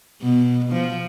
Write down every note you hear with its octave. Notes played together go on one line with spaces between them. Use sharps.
B2
F3